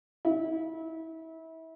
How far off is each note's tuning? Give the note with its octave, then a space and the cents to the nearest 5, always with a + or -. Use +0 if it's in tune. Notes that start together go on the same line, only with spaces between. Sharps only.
E4 -30